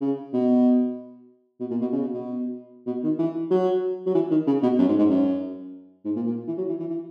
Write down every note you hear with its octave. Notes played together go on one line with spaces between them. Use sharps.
C#3
B2
B2
A#2
B2
C#3
B2
B2
B2
D#3
E3
F#3
F#3
E3
D#3
C#3
B2
F#2
G#2
G#2
F#2
G#2
A#2
A#2
E3
F#3
E3
E3
E3